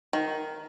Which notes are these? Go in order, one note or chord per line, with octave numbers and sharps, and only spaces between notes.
D#3